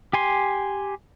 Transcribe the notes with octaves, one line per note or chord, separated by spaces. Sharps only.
G4 G#5 C6